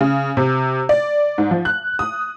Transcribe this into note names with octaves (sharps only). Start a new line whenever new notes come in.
C#3
C3
D5
G#2
F3
F#6
D#6